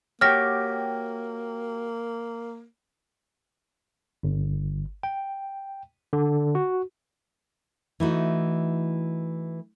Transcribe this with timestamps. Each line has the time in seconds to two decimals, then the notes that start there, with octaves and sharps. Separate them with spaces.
0.21 A#3 F#4 G4 C#5 G5 D6 F6 A#6
4.23 G1
5.03 G5
6.13 D3
6.55 F#4
8.00 E3 A3 D#4 F#4